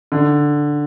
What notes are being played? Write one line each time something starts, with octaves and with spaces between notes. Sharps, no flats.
D3